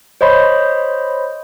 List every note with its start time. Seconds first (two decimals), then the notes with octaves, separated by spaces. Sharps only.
0.21 C5 C#5 D#5 B5 C6